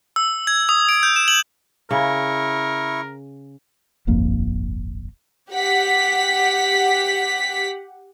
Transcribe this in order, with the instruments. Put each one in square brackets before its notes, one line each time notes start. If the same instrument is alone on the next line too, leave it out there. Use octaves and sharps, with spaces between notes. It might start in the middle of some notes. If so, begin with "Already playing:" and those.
[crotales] E6
G#6
D#6
D7
G6
E7
F#7
[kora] C#3 [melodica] E4 C#6 [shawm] A#4
[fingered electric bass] D1 G1 F2 A#3
[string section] G4 F#5 B6